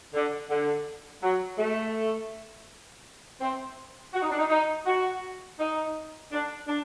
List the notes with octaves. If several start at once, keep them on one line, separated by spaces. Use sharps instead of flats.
D3
D3
F#3
A3
C4
F#4
D#4
D4
D#4
D#4
F#4
D#4
D4
D4